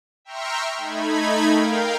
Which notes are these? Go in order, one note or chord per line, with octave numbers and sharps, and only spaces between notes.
E5 G5 A#5 C6 C#6 F6
A3 D#4 B5 G#6
A#4 F5 G5